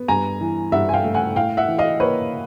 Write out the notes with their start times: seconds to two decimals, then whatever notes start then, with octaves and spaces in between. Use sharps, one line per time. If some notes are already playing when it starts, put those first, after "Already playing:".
Already playing: B3
0.08 G2 G#5 A#5
0.41 E3
0.72 G2 E5 F#5
0.89 G#5
0.93 F5 G5
1.04 A3
1.14 F#5 G#5
1.36 A2 F5 G5
1.57 E5 F#5
1.68 E3
1.78 D#5 F5
2.00 A#3 B4 C#5